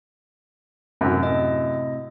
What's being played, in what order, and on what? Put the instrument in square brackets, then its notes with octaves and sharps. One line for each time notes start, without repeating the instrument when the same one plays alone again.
[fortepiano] F#2 F#3 [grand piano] A2 C3 E4
[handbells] D#5